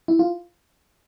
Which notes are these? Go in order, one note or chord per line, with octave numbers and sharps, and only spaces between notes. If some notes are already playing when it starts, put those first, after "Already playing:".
E4
F4